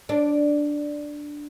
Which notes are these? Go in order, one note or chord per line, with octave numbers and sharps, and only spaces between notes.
D4